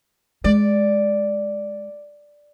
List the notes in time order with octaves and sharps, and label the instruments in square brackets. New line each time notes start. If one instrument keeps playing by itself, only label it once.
[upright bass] G#3 [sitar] D5